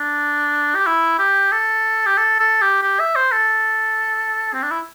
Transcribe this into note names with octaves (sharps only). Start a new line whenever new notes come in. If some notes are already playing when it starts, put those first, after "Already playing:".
Already playing: D4
G4
E4
G4
A4
G4
A4
A4
G4
G4
E5
C5
A4
C4
D4
E4